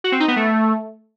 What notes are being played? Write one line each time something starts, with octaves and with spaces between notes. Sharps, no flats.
F#4
C4
D#4
B3
A3